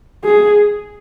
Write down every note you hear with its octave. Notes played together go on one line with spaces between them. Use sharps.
G#4